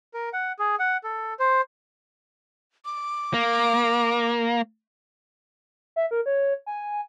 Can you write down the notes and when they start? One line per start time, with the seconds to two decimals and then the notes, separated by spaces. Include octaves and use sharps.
0.14 A#4
0.33 F#5
0.59 G#4
0.79 F#5
1.04 A4
1.39 C5
2.85 D6
3.34 A#3
5.96 E5
6.11 A#4
6.26 C#5
6.66 G#5